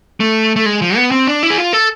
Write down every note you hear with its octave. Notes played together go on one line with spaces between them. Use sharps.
A3
A3
G#3
F3
B3
C4
D4
E4
G#4
F4
A4